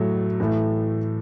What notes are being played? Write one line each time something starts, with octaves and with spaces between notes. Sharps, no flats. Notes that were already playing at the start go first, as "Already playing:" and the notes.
Already playing: A2 F#3 A3
A2 E3 A3